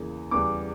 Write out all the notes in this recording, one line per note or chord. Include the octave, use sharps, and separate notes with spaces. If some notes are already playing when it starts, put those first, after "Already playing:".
Already playing: E2 C#3 E3 A#3
E2 C#3 G3 B3 D6